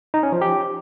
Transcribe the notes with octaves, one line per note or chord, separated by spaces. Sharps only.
D#4
C#4
F3
G4